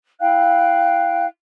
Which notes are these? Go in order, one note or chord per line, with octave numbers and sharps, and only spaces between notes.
E4 F5 G5 F#6